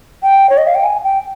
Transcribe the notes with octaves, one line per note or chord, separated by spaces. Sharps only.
G5
C#5
D#5
F5
G5
G#5
G5